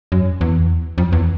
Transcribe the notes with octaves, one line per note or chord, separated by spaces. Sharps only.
F#2
E2
F2
E2